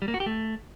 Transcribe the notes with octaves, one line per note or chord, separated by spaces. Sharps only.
G3
A#3
F#4
G4
A3